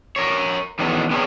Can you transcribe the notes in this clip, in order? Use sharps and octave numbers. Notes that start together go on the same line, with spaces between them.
A#4 C#5
D#3 E3 F#3 G#3 A3 B3
B3 C4 D4 G#4 A#4 C#5